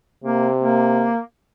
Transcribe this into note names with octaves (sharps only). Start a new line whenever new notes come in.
C3 A#3
A#3